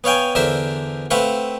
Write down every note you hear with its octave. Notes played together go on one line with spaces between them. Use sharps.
B3 C#5 F5 G5 G#5
E2 D3 D4 A#4 C5 E5
A3 C4 B4 F5 F#5